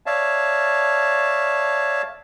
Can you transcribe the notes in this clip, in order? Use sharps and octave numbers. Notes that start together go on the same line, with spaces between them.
C#5 D5 E5 F5 A5